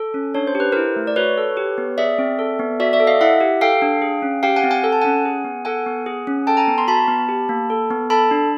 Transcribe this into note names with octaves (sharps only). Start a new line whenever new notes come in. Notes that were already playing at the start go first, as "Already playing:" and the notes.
Already playing: A4
C#4
D4 C#5
C5
G4
B4
E4 A#4 C5
A3
D5
F#4 B4 C#5
A4
G4
B3
G#4 D5 E5
C4
A4
B3
F#4 D5 E5
D5 E5
A4
D#5 F5
E4 E5 F#5
G4
A4 F5 G5
D4
G#4
C#4
G4 F5 G5
F#5 G#5
C4
F#5 G#5
A4 G#5
A5
C#4 F#5 G#5
G#4
B3
A4 F#5 G#5
B3
G#4
C#4
A4 G5 A5
G#5 A#5
B3
A#5 C6
F#4 A5 B5
B3
G4
A#3
A4
B3
A4 A5 B5
D4